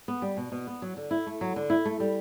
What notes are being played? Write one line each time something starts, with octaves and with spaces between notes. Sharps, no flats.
B3
G3
B2
B2
B3
F#3
D3
E4
A3
F#3
D3
E4
A3
G3